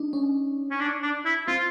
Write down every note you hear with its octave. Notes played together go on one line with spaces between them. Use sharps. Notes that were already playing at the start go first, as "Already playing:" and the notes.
Already playing: D4 D#4
C#4
C#4
D4
D4
E4
C4 F4